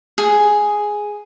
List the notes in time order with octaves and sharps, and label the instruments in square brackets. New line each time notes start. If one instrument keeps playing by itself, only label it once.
[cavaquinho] G#4